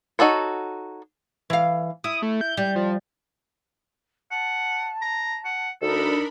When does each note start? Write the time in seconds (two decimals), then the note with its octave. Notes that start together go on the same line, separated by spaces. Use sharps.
0.19 D#4 F#4 A4 C#5
1.50 E3 F5
2.04 E4 D#6
2.22 A3
2.41 G6
2.57 G3
2.76 F3
4.31 F#5 A5
5.02 A#5
5.45 F#5
5.82 D2 D4 D#4 A4 A#4 B5